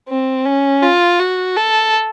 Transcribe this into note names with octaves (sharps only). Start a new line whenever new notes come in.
C4
C#4
F4
F#4
A4